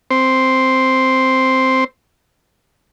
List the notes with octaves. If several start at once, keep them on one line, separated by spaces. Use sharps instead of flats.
C4 C5